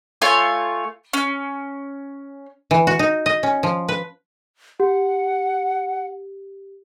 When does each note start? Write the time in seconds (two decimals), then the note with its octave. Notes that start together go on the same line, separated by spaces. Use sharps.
0.22 A3 F4 C#5 G#5
1.13 C#4
2.71 E3
2.87 F#4
2.99 D#4
3.26 D#5
3.43 C#4
3.63 F3
3.89 B4
4.80 G4 F#5